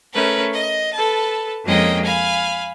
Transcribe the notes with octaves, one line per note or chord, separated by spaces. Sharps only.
A3 C#4 A#4 B4
D#5
A4 B4 A5
F2 G#3 A#3 C#4 D#5 G5
F5 G#5 B5